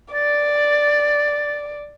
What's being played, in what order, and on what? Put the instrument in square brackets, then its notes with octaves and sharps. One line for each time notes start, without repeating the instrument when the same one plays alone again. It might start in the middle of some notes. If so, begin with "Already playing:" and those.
[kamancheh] D5 [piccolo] A6